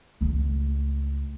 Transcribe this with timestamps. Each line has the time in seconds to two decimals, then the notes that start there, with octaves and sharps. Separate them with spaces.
0.21 C#2 A3